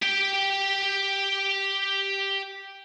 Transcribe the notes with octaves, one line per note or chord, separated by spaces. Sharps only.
G4 G5